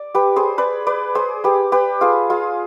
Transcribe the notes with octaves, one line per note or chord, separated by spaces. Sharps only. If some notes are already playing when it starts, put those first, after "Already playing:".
Already playing: D5
G4 B4
G#4 C5
B4 D5
B4 D5
G#4 C5
G4 B4
G4 B4
F4 G#4
F4 G#4